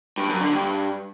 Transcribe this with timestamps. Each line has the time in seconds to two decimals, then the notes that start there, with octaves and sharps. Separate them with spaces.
0.18 G2
0.29 F#2
0.41 D3
0.53 G2